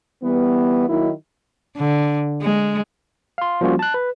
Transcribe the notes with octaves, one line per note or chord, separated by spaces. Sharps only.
E3 G3 B3
D#3 F#3 A#3 D#4 E4
D3
G#3
F5 C6
F3 G3 A#3 C#4 F4 F#4
A5 F#6
B4